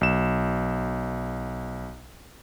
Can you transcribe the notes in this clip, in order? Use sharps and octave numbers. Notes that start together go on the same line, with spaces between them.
B1 E7